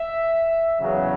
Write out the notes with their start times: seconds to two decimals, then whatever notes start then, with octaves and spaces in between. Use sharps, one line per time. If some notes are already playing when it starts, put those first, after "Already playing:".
Already playing: E5
0.79 E2 C#3 F#3